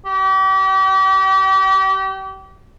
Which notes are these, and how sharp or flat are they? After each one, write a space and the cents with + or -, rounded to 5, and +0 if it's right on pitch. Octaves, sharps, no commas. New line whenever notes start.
G4 -35